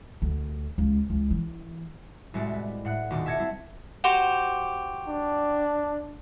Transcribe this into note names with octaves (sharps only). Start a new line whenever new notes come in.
D2
C#2
C#2
E3
C2 A2 G3 G#3 F#4 D5
B4
A2 F#5 F#6
D#1 D#2 B2 D#4 F#4 D6
E5 A5 G#6 A#6 C#7
G3 C4 E4
F#4 G4 C5
D4